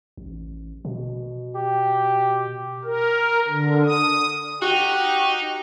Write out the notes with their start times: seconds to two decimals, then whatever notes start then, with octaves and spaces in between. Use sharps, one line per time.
0.17 A1
0.85 B2
1.55 G4
2.84 A#4
3.48 D3
3.86 D#6
4.62 D#4 F#4 G4